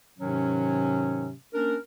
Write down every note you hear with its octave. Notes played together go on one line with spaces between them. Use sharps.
G#2 C3 D#3 F#3 C#4
A#3 C#4 D4 A#4